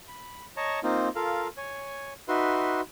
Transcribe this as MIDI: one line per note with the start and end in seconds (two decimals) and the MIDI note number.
0.08 0.46 83
0.57 0.80 73
0.57 0.80 75
0.57 0.80 81
0.57 0.80 82
0.57 0.80 85
0.83 1.09 58
0.83 1.09 60
0.83 1.09 63
0.83 1.09 65
1.15 1.48 65
1.15 1.48 69
1.15 1.48 70
1.15 1.48 77
1.57 2.13 73
1.57 2.13 80
2.28 2.81 63
2.28 2.81 66
2.28 2.81 71
2.28 2.81 76
2.28 2.81 84